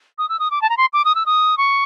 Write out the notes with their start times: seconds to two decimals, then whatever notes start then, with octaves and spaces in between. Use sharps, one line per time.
0.18 D#6
0.29 E6
0.39 D#6
0.51 D6
0.62 A5
0.70 A#5
0.77 C6
0.93 D6
1.05 D#6
1.15 E6
1.26 D#6
1.58 C#6